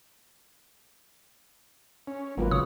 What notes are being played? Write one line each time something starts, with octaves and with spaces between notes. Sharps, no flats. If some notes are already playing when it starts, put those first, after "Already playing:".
C#4
G#1 F#3 A#3 F4 B4
C#3 C#5 D#6